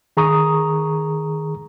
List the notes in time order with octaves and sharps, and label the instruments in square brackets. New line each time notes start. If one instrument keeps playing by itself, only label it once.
[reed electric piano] D#3 G#4 A#5 C#6 D#6